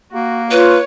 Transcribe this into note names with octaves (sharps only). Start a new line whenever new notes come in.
A#3 F#4
F4 B4 C#5